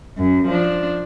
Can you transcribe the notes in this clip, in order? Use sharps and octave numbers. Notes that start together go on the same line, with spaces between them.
F#2
F3 D4